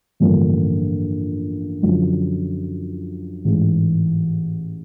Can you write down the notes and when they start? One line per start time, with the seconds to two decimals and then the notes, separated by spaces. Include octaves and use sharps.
0.20 A1 G2 D3 F3 A#3
1.83 F#2 D3 F3
3.45 A1 G#2 E3